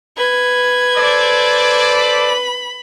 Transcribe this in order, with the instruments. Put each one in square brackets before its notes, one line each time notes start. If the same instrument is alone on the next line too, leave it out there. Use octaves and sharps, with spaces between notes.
[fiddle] B4 [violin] G#6
[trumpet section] A4 C5 D5
[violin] B5